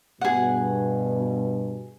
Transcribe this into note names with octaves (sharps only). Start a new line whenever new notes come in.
G2 B2 G#4 F#5